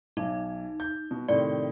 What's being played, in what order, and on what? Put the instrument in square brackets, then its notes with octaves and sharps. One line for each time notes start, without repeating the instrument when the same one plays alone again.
[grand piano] B1 [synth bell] D#4
[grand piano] G6
B2
[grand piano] A2 C3 D#3 [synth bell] D5